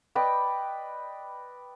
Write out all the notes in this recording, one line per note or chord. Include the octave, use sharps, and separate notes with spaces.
B4 D5 D#5 G5